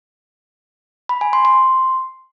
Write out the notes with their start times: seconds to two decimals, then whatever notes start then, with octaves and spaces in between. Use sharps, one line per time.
1.09 B5
1.21 G#5
1.33 C6
1.45 C6